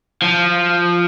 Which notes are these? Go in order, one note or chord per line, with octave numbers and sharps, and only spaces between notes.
F3